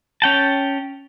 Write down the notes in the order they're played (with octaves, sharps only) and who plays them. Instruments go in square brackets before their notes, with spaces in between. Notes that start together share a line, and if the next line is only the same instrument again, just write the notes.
[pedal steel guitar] C#4 G5 A5